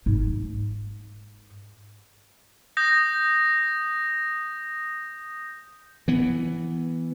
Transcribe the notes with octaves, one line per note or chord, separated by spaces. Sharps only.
G#2 D#4
D#6 G6 A#6
E3 B3